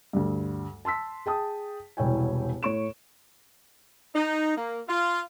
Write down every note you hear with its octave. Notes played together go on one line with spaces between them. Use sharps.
D2 G2
A5 C6 E6 B6
G#4 G5 A5 D#6
E1 C2 E4 C#5 G5 G#5
A2 C#5 C#6 D7 E7
D#4
A#3
F4